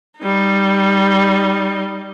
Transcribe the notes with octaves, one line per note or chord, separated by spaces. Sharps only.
G3 D#4